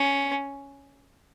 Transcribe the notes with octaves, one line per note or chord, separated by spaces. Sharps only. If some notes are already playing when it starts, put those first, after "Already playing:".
Already playing: C#4